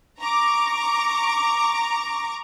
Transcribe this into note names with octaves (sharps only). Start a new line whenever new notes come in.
A#5 C#6 D6